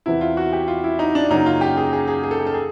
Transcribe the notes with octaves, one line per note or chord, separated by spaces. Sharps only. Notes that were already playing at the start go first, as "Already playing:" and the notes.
E2 C3 E3 E4
F4
F#4
G4
F4
E4
D#4
D4
F#2 C#3 F#3 A#3 C#4 D#4
F4
G4
G#4
G#4
G#4
G#4
A4
G#4
A4
G#4